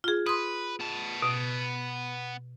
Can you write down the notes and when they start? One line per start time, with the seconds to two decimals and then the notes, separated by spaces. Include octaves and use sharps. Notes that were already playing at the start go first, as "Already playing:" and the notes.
0.04 F4 G#4
0.27 B4 C6 D#6
0.80 B3 A5
1.22 B2